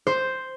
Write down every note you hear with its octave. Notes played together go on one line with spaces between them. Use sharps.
C5